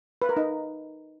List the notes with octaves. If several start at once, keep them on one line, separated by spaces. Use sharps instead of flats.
B4
A#4
D#4